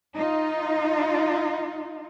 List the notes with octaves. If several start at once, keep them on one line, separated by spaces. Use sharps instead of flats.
D#4 F4